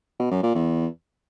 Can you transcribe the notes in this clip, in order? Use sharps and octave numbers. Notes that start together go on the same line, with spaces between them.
B2
F#2
A#2
E2